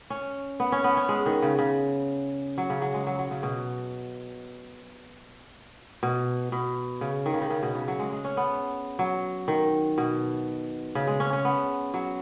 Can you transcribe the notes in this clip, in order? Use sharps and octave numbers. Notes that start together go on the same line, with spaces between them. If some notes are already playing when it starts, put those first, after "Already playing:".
C#4
B3
C#4
B3
C#4
G#3
D#3
C#3
C#3
F#3
C#3
F#3
G#3
F#3
F#3
C#3
B2
B2
B2
C#3
D#3
C#3
D#3
C#3
B2
C#3
F#3
G#3
G#3
C#4
B3
F#3
D#3
B2
C#3
G#3
C#4
C#4
B3
F#3